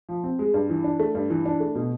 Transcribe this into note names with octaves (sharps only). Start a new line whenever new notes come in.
F3
C4
G#3
G2
E3
D4
A3
G2
E3
D4
A3
B2